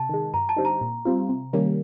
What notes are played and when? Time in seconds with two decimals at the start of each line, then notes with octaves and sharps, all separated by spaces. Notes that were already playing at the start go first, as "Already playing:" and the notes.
Already playing: C3 A5
0.09 D#3 G#3
0.34 G2 A#5
0.49 A5
0.56 D3 G3 C4 D#4
0.65 A#5
0.81 A#2
1.05 G3 C4 F4
1.29 C3
1.53 D#3 G3 A#3 C#4